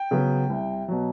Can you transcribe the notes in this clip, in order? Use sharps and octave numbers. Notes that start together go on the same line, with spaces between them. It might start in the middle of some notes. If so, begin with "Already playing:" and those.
Already playing: G5
C#3 F#3 B3
C2
B2 F#3